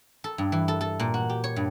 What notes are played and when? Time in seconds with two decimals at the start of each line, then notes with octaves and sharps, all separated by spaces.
0.24 A4
0.38 G2
0.52 E3
0.68 A4
0.81 A4
1.00 A#2
1.14 F#4
1.29 G4
1.44 C#5
1.56 G2